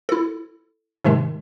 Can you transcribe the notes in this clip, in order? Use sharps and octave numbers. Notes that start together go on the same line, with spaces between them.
E4 A4
G#2 C3 D#3 G#3